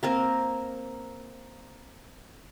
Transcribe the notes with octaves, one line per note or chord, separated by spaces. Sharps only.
A#3 C4 A#4